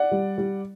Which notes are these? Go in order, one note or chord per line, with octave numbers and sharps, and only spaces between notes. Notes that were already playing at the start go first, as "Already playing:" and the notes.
Already playing: D5 F#5
G3
G3